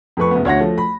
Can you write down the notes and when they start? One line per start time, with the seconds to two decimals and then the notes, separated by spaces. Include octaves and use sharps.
0.17 F2 A3 B4 C#6
0.31 F#1 B3
0.45 D2 C#5 F#5 A#6
0.60 F3 A3
0.78 B5